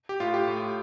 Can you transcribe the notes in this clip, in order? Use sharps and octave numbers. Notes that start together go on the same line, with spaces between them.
G4
A2 F4
G4
A2